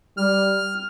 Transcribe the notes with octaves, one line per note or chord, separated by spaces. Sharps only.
G3 F6